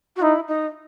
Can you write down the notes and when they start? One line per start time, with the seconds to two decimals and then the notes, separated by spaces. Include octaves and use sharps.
0.16 F#4
0.22 D#4 E4
0.48 D#4